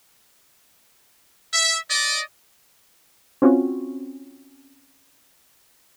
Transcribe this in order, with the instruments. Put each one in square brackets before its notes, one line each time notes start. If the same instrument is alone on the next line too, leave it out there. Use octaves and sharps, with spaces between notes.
[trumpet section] E5
D5 D#5
[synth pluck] C4 C#4 F4 F#4